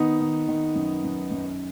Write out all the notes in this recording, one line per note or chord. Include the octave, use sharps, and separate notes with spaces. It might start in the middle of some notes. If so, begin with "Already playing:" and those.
Already playing: D#3 B3 D#4
D#3
D#3
F#2
F#2
F#2